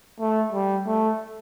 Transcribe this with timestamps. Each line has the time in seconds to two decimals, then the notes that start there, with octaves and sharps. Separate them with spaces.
0.20 A3
0.53 G3
0.87 A3